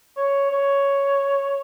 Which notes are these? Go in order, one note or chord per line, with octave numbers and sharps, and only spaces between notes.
C#5
C#5